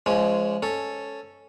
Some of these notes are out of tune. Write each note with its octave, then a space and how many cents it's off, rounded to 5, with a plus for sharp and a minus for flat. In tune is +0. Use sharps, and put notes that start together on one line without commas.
F3 -25 G#3 +0 C#4 +0
C#4 +0 A4 +0